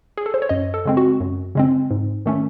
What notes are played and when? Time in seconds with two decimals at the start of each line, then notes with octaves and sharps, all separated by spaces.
0.18 G#4
0.26 A4
0.34 C5
0.42 C#5
0.49 F#2 D#5
0.74 A4
0.85 C#3 G#3 C4
0.97 F#4
1.21 F#2
1.55 C#3 G#3 C4
1.91 G#2
2.26 D#3 A3 C#4